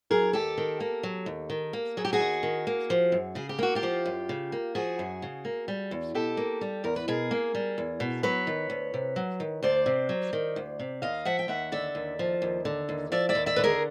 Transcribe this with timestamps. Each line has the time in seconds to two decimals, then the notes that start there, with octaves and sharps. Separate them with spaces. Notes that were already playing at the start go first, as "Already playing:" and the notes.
0.11 F#3 G#4 A#4
0.33 D#2 G4 A4
0.58 D#3
0.80 A#3
1.03 F#3
1.26 D#2
1.50 D#3
1.73 A#3
1.97 F#3 G#4
2.05 G4
2.13 F#4 G#4
2.19 D#2
2.43 D#3
2.67 A#3
2.90 F3
3.12 F#2
3.35 C#3 G#4
3.49 G4
3.59 A#3 F#4
3.75 F4 G4
3.83 F3
4.05 F#2
4.29 C#3
4.52 A#3
4.75 F3 F#4 G#4
4.99 F#2
5.22 C#3
5.45 A#3
5.68 G3
5.91 E2
6.14 B2 G4 A4
6.37 A#3
6.61 G3
6.84 E2 A#4
6.96 B4
7.08 B2 G#4 A#4
7.31 A#3
7.55 G3
7.78 E2
8.00 B2
8.23 F#3 B4 C#5
8.47 D#3
8.70 D2
8.94 C3
9.16 F#3
9.40 D#3
9.63 D2 C5 D5
9.86 C3
10.09 F#3
10.33 D#3
10.56 D2
10.79 C3
11.02 D#2 D#5 F5
11.25 F3 E5 F#5
11.39 G5
11.48 D#2 E5 F#5
11.72 D3 D5 E5
11.95 D#2
12.19 F3
12.42 D#2
12.65 D3
12.89 D#2
13.12 F3 D5 E5
13.29 D5 E5
13.35 D#2
13.46 D5 E5
13.56 D3 B4
13.64 G#4 A#4